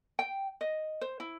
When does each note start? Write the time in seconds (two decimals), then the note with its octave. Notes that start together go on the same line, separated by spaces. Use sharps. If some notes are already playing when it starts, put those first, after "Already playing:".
0.19 G5
0.61 D#5
1.01 C5
1.20 E4